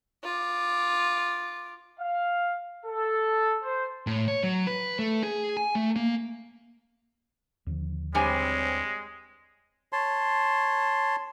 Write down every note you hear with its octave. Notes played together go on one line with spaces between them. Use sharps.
F4 D6
F5
A4
C5
A2
C#5
F#3
B4
A3
G#4
G#5
A3
A#3
D#2 D3 F3
G2 G3 G#3 C4 C#5 G#5
C#5 A5 C6